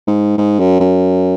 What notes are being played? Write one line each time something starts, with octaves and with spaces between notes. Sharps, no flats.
G#2
G#2
F#2
F#2